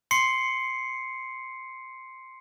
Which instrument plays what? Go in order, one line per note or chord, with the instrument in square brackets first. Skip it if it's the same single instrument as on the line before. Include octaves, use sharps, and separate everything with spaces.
[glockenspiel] C6 C7 C#7